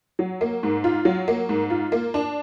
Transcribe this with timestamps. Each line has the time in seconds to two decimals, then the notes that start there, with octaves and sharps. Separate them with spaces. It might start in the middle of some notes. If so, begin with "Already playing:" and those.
0.19 F#3
0.41 A#3
0.63 G#2
0.84 F4
1.05 F#3
1.28 A#3
1.49 G#2
1.70 F4
1.92 A#3
2.14 D4